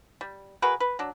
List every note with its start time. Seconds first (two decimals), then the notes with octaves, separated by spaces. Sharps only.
0.21 G3
0.62 F#4 G#4 A#4 B4
0.80 B4
0.99 F#3 D4